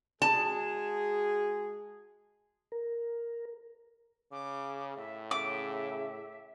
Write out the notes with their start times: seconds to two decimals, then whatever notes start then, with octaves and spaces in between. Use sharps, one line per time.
0.22 G#3 F#4 G#4 A5
2.72 A#4
4.32 C#3 D6
4.97 A2 E5
5.31 C#3 E5 D6